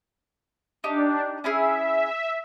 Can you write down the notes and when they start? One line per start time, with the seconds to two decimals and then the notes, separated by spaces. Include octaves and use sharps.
0.84 D4 D#4 G4
1.44 C#4 E4 G#4 E5